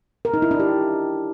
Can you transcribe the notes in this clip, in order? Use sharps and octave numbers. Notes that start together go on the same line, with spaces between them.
A#4
D#4
E4
D4
G4